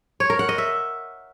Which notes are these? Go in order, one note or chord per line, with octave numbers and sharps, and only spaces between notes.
C#5
A#4
F#5
D#5
E5